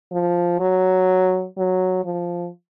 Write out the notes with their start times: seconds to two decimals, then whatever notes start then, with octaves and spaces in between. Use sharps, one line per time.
0.12 F3
0.60 F#3
1.57 F#3
2.05 F3